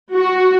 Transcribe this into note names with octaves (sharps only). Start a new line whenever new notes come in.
F#4